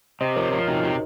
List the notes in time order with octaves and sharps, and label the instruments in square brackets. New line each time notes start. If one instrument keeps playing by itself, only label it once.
[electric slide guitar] C3 [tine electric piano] C5 D#5
[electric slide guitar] F3 [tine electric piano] A#4 C#5
[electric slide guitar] F3 [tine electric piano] A#4 C#5
[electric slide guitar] C3 [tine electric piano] D#4 F#4
[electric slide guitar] C3